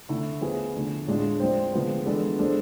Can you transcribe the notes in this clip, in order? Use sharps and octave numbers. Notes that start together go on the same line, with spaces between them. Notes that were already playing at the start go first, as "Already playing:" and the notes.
D3 A3 E4
F3 B3 E4 G#4
D3 A3 D4
A2 G#3 D4 F4
F3 G#3 C4
D3 F3 G#3 B3
E3 G#3 B3 D4 A4
G#3 D4 A4 C5